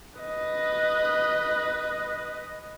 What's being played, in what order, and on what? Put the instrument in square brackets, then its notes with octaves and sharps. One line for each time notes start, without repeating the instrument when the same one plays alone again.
[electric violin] B4 D#5